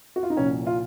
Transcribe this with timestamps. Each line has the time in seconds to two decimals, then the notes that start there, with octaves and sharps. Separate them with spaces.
0.16 F#4
0.23 F4
0.30 D#4
0.37 C2 A#2 F3 C#4
0.66 F4